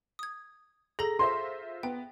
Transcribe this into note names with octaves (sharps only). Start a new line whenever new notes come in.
D#6 G#6
G#4 A4 A#5 A#6
F4 C5 E5 C6
B3 G5